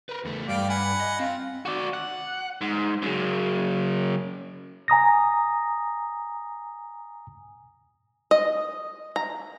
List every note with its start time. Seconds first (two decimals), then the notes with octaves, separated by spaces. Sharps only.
0.09 A#4 B4
0.25 E2 A3
0.48 G2 D5 F5 G5
0.69 F#5 G#5 B5
1.01 D#5
1.20 C4 F4
1.66 F#4 D5
1.93 F#5
2.61 G#2
3.02 F#2 C#3
4.88 G#5 A#5 D#6 A#6
8.31 D#5
9.16 A#5